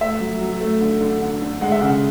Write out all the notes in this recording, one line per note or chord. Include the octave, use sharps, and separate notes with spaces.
A3 E5
F#3
F#3
A3
D3
D3
D3
D3
G#3 F#5
E5
C#3 F#5